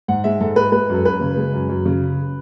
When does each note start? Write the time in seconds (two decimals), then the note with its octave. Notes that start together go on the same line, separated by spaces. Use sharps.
0.08 G#2 F#5
0.24 G#3 E5
0.40 G#2 A4
0.56 G#3 B4
0.72 G#3 B4
0.89 F#2 A4
1.05 F#2 B4
1.21 C#3
1.37 G#3
1.53 F#2
1.69 F#2
1.86 C#3